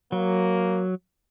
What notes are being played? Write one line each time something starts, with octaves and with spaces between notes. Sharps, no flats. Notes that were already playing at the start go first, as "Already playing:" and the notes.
F#3 A#3